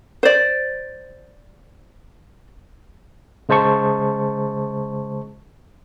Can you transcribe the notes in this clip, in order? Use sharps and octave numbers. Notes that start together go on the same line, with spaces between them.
C5 D5
C#3 G#3 C5 A5 C#6